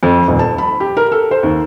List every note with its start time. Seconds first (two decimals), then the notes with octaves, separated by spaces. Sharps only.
0.03 F2
0.28 D#1
0.39 A5
0.58 B5
0.80 G4
0.97 A#4
1.12 A4
1.31 C5
1.43 D#2